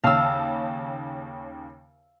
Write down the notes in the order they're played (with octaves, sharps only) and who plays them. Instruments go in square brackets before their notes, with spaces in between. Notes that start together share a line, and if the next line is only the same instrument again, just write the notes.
[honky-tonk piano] D#2 C#3 A5 [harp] F5 E6